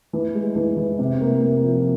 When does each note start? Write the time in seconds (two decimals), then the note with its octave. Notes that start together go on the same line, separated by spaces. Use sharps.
0.13 E3
0.35 G#3
0.56 E3
0.77 E3
0.99 C3
1.21 A#3
1.42 A#3
1.63 F3